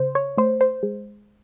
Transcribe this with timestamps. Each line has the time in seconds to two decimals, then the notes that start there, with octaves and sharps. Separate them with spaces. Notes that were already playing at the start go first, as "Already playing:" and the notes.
Already playing: C#3 C5
0.15 C#5
0.37 A3 C5
0.61 C5
0.83 G#3